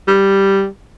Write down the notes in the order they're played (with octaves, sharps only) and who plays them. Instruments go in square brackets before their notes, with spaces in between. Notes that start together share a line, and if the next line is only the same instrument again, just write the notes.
[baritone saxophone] G3